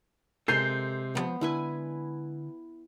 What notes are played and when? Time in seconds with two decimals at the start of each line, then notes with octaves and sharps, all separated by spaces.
0.48 C3 G#3 A4 A#4 G#5 G6 C7
1.15 C2 F3 B3
1.41 D3 E4 B4 G#5